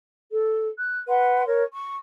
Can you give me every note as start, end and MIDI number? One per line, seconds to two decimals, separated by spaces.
0.29 0.68 69
0.78 0.97 90
1.07 1.44 71
1.07 1.44 78
1.07 1.44 84
1.45 1.62 70
1.45 1.62 73
1.73 1.95 85